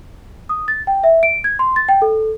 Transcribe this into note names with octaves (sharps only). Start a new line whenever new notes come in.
D#6
A6
G5
E5
D7
G#6
C6
A6
G5
A4